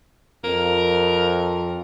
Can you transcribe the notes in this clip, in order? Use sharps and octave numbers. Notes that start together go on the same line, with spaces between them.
F2 A#4